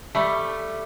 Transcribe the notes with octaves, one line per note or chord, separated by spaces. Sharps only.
G3 A3